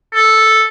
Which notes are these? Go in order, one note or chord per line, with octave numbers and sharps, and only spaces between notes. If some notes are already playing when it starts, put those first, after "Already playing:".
A4